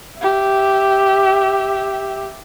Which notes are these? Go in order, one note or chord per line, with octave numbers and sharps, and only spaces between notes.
G4 E5